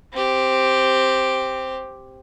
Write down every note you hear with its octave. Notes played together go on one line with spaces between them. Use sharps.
C4 G4